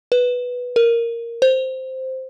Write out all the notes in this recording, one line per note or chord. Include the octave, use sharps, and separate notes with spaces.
B4
A#4
C5